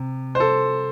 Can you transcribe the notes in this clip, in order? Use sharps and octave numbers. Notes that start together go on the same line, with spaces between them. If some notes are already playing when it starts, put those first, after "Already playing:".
Already playing: C3
C5
A4